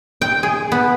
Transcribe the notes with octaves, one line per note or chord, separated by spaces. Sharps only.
G5
G#4
B3